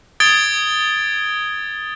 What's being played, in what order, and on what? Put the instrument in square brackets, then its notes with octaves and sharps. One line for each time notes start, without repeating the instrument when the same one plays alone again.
[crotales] D#6 G#6 A6 D7 G7